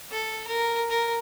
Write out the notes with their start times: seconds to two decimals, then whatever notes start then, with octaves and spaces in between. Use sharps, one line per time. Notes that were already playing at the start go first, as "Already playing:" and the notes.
0.12 A4
0.47 A#4
0.90 A#4